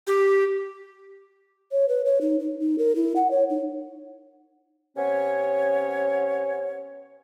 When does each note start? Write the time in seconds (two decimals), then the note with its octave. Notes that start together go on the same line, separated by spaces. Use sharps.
0.07 G4
1.72 C#5
1.88 B4
2.05 C#5
2.21 D#4
2.40 D#4
2.60 D#4
2.78 A#4
2.96 E4
3.16 F#5
3.31 C#5
3.50 D#4
4.97 C3 B3 C#4 C#5